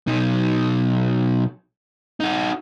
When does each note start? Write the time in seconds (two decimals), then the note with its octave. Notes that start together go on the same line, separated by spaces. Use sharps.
0.07 B1 D#4
2.20 D#4 F#4